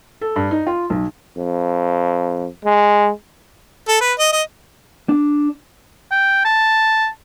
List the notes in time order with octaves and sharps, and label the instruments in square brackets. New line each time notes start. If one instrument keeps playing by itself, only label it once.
[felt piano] A4
G2
D#4
F4
B1
[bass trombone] F2
G#3
[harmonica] A4
B4
D#5
D#5
[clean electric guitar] D4
[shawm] G5
A5